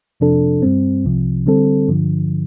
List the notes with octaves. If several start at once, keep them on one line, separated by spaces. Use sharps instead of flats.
F2 C3 F3 D4 A4
G2 G3 C4
C2 C3 F3
D3 G3 C4 A4
G2 D3 F3